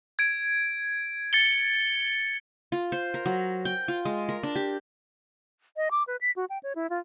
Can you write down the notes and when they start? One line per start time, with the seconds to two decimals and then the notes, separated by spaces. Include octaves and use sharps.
0.19 G#6 D7
1.33 A6 C#7 G7
2.72 F4
2.92 C5
3.14 A#4
3.26 F#3
3.65 G5
3.88 F4
4.05 G#3
4.29 A#4
4.43 D4
4.55 G4
5.77 D#5
5.91 D6
6.07 B4
6.21 B6
6.36 F#4
6.50 G5
6.63 C#5
6.75 E4
6.90 F4